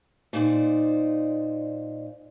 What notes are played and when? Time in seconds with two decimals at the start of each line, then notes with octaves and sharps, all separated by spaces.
0.33 A#2 D#4 C5 D5